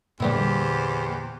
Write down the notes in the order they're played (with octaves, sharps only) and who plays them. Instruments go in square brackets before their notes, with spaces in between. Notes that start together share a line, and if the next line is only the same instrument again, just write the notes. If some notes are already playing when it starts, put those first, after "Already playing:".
[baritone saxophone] E2 [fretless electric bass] A#2 D3 [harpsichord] G3 B3 E4 [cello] G4 C5